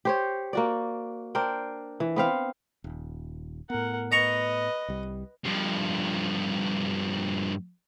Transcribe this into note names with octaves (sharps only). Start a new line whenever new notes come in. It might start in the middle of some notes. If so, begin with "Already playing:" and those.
G4 C5 C#5
A#3 F#4 D5
D4 A#4 C5 G5
E3
B3 C4 F5
D#1
A2 B3 A#4 F#5
B4 D#5 A#5 C#6
C2 G3
G2 F3